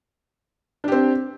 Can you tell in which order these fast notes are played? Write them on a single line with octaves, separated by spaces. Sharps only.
D4 G4 C4